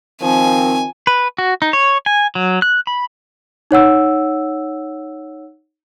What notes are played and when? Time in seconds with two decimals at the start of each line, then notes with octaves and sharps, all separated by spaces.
0.22 D#3 F3 C4 G#5
1.07 B4
1.38 F#4
1.62 D#4
1.73 C#5
2.06 G#5
2.35 F#3
2.62 F#6
2.87 B5
3.71 D#4 C#5 F#5 E6